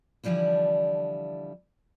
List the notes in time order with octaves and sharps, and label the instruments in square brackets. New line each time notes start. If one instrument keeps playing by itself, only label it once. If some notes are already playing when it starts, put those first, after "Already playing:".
[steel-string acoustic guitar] D3 E3 F3 G3 D4 E4